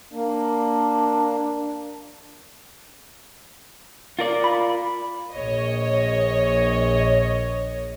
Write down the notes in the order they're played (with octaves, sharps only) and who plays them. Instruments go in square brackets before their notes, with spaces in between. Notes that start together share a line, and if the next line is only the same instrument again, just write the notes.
[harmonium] A#3 [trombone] D4
[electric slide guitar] F4 A#4 D5
[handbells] B5
[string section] A#1 C#5 D#5